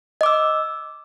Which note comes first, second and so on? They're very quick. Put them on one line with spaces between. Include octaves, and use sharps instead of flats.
D#5 D6 E6